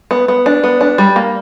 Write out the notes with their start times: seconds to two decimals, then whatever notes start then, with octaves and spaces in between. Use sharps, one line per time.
0.11 B3
0.28 B3
0.46 D4
0.64 B3
0.81 D4
0.98 G3
1.16 A#3